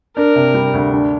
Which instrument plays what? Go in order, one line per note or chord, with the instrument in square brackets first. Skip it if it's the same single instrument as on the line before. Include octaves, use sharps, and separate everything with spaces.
[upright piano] D4 [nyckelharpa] A#4
[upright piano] C3
G3
D2
D4